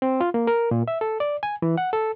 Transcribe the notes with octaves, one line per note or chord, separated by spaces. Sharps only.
C4
F4
A#3
A#4
A#2
E5
A4
D5
G#5
E3
F#5
A4